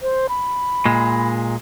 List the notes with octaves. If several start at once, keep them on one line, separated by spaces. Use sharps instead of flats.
C5
B5
A#2 G#3